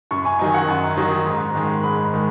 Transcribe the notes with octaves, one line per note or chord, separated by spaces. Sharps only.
F#2 C#6
G#5
D#3 F#3 D#4 G#5
F#5
F#2
D#3 F#3 D#4
G#2
D#3 G#3
G#2 B5
D#3 G#3